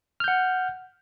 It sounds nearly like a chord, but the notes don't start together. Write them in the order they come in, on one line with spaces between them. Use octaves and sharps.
F6 G6 F#5